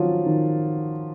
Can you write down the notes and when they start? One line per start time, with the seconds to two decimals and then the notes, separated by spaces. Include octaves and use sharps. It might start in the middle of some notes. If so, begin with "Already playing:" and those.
Already playing: D#3 F3 F#3 C#4 F4
0.26 D#3